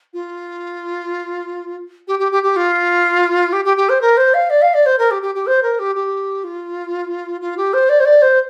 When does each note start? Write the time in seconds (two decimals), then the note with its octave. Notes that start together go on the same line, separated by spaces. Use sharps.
0.13 F4
2.07 G4
2.19 G4
2.32 G4
2.43 G4
2.56 F4
3.52 G4
3.65 G4
3.77 G4
3.89 C5
4.01 A#4
4.17 C5
4.34 F5
4.50 D5
4.62 F5
4.74 D5
4.86 C5
4.98 A#4
5.11 G4
5.22 G4
5.35 G4
5.46 C5
5.62 A#4
5.79 G4
5.95 G4
6.44 F4
7.41 F4
7.57 G4
7.73 C5
7.89 D5
8.00 C5
8.05 D5
8.22 C5